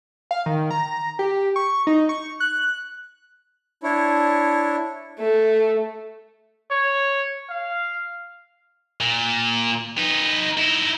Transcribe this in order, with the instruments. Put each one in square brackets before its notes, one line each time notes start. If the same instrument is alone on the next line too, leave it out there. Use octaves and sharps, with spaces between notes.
[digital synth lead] F5
D#3
A#5
G4
C#6
D#4
C#6
F#6
[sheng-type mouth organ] D4 E4 C#5
[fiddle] A3
[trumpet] C#5
F5
[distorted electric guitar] A#2
D#4 B4
D#4 E4